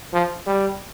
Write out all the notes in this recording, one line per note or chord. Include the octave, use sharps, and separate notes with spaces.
F3
G3